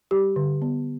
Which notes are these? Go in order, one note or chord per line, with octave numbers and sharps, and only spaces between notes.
G3 G4
D3
B3